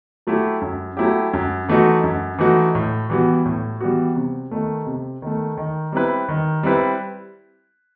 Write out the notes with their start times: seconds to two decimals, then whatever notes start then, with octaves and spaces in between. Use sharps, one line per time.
0.27 F#3 A3 E4 G4
0.61 F#2
0.97 F#3 A3 E4 G4
1.33 F#2
1.69 E3 A3 D#4 F#4
2.04 F#2
2.38 E3 A3 D#4 F#4
2.75 A2
3.10 E3 G3 B3 F#4
3.45 A2
3.80 E3 G3 B3 F#4
4.16 C3
4.51 D#3 A3
4.87 C3
5.22 D#3 A3
5.57 D#3
5.92 G3 C4 E4 B4
6.29 D#3
6.63 G3 C4 E4 B4